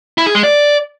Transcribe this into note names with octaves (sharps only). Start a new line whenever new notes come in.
E4
G#4
G#3
D5